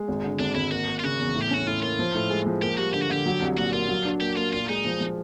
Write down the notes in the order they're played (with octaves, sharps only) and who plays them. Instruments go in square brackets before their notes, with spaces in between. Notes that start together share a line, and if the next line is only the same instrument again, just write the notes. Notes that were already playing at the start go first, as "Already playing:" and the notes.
Already playing: [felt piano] G#3
G#1
D3
[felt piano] G#1 [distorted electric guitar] D4
[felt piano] G#1 [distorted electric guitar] E4
[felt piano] A#3 [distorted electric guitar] F#4
[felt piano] A#3
[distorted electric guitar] F4
[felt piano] C#3 [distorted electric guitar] F#4
[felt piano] E2
A2
[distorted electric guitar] G4
[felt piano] C#4 [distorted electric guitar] F#4
[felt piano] A2 [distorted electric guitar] F4
[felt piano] A#3 [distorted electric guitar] F4
[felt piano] F3
A2
G#3
F3
[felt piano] A#3 [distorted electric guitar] G4
[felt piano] G3 [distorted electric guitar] F#4
[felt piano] D3 [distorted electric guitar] G4
[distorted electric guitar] F#4
[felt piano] D3 [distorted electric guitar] G4
[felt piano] F#3
C2
[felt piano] A#2 [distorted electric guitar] F#4
[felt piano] A#3 [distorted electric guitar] F4
[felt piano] F#3
D4
[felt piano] A#3 [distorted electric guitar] G4
[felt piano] A#3 [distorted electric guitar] F4
[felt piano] A#2 [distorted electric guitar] F4
[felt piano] G#3 [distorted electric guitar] D#4
[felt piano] F3
F3